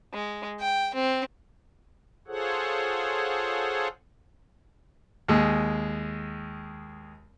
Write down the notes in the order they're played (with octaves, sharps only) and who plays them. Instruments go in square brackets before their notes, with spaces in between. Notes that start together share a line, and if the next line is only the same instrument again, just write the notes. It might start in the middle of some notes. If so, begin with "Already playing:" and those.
[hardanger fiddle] G#3
G5
C4
[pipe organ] F4 G#4 A4 C5 C#5 F#5
[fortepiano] D#2 G#3